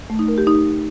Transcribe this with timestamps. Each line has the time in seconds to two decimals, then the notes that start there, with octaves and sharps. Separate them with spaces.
0.10 A3
0.19 D#4
0.28 A#4
0.38 G4
0.47 D#4